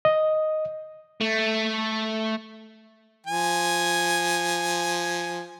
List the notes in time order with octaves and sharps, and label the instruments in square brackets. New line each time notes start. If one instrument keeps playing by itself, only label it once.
[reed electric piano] D#5
[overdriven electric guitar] A3
[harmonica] F3 G#5